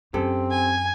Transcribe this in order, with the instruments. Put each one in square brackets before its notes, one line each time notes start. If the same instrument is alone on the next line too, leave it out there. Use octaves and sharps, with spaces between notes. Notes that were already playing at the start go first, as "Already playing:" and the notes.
[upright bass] F#2 [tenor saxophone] C4 [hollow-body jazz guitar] G4 A4
[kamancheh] G#5